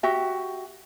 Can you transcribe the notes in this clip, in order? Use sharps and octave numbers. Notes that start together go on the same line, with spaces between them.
F#4 G4 E5